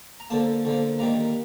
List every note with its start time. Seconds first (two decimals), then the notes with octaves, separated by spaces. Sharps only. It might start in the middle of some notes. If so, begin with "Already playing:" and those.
0.20 A#5
0.30 D3 F3 A#3 A5
0.65 D3 F3 A#3
0.99 D#3 G3 A#3 A#5